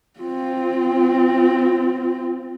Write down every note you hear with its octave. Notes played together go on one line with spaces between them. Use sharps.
C4 F4